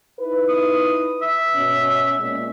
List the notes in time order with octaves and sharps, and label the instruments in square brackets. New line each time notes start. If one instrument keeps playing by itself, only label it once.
[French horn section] D#4 E4 B4
[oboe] D#6
E5
[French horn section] B2 C#4
A#2 G#3 C#4